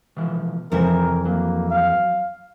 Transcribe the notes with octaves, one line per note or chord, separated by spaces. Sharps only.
B2 E3 F3
F2 C3 E3 F3 A#4 E5
F#3 A#3
F5